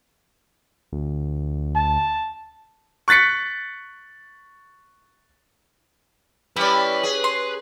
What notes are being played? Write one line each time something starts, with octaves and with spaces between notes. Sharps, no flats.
D2
A5
C#6 F#6 A6 B6 C#7
G3 C#4 E4 B4 D5
G#4
C6